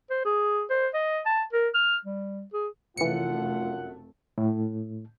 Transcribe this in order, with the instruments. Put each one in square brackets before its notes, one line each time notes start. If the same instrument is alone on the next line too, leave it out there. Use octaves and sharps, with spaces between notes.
[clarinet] C5
G#4
C5
D#5
A5
A#4
F6
G3
G#4
[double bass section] F1 A3 [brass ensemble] F#2 F4 F#5 [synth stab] E3 C#7
[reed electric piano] A2